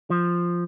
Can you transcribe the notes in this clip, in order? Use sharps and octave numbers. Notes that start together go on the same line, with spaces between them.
F3